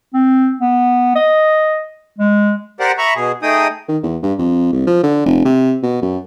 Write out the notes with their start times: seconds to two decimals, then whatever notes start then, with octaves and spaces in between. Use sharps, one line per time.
0.14 C4
0.60 B3
1.16 D#5
2.18 G#3
2.80 G4 A#4 C5 D5 F#5
2.98 E5 A#5 B5 C#6
3.15 B2 G#4
3.43 A3 D#4 G#4 G5 D#6
3.88 D#3
4.03 E2
4.23 G2
4.38 F2
4.73 C2
4.87 F3
5.03 D3
5.26 F1
5.45 C3
5.83 B2
6.02 F#2